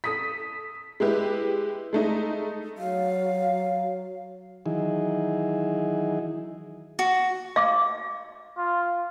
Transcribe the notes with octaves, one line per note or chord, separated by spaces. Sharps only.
A4 D#6 B6
G#3 E4 G4 B4
G#3 A3 D#4
F#3 F5
D#3 E3 F#3 D#4 E4 G#4
F#4
F5 D6
F4